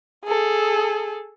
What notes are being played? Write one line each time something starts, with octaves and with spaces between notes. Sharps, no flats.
G#4 A4